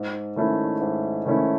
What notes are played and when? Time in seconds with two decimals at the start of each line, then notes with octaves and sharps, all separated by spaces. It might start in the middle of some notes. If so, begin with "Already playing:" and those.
Already playing: G#2
0.36 D#3 A3 C#4 E4
0.81 G#2
1.26 D#3 A3 C#4 E4